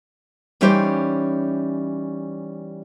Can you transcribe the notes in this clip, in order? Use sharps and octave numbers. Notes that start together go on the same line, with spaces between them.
E3 G3 C#4 D#4 G4 C5